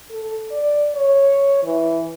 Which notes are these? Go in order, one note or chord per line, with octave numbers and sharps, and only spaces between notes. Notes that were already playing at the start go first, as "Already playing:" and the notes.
A4
D5
C#5
E3